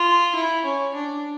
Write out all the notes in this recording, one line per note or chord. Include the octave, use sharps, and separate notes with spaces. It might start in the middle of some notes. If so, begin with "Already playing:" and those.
Already playing: F4
E4
C#4
D4